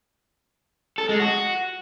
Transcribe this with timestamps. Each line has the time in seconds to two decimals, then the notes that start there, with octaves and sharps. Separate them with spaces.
0.98 A4
1.09 G#3
1.20 F#4